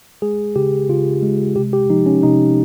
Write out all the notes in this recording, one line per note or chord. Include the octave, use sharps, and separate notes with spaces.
G#3 G#4
C#3 G4
C#3 F4
G#3
C3 G4
G4
F3 D#4
C#4
C3 D#4